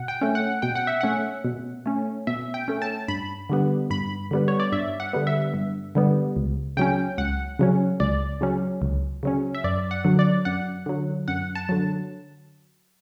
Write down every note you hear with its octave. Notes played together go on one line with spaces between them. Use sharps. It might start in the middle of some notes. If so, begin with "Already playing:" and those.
Already playing: B2 F#5
G5
A3 C#4
F#5
B2 G5
F#5
E5
A3 C#4 F#5
B2
A3 C#4
B2 E5
G5
A3 C#4
A5
G2 B5
D3 G3 B3
G2 B5
D3 G3 B3
C#5
D5
G2 E5
F#5
D3 G3 B3
E5
G2
D3 G3 B3
C#2
C#3 F#3 C#4 G5
C#2 F#5
C#3 F#3 C#4
C#2 D5
C#3 F#3 C#4
C#2
C#3 F#3 C#4
E5
F#2 D5
F#5
D3 F#3
D5
F#2 F#5
D3 F#3
F#2 F#5
A5
D3 F#3